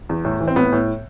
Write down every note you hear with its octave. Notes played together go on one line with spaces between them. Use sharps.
E2
A2
E3
C4
A2 B3
A2